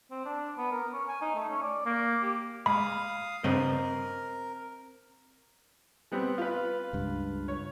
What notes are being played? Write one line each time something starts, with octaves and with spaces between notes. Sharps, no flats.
C4
D4
B3
A#4
C#4
G#5
D#4
A3
C#4
D5
A#3
G4
G#3 F5 B5 D#6
G2 C#3 B3 C4 A#4 D#5
G3 B3 C4
F4 B4
C#2 G2
C#5